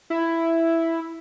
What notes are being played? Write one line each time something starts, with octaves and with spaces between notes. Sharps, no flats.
E4